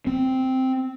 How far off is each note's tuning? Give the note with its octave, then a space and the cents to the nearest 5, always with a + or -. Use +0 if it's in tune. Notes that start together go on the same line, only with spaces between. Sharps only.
C4 -5